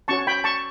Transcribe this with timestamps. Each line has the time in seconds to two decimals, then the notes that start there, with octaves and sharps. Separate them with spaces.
0.08 C#4 F#4 C#5 A5 C#6
0.27 G5 B5
0.44 A5 C#6